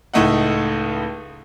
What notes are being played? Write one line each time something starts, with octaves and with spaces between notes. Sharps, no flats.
C#2 A2 A3 D#4 F#5